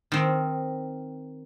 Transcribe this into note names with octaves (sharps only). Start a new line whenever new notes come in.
D#3 C4